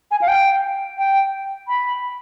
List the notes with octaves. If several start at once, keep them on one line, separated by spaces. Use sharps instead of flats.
G#5
F5
G5
G5
B5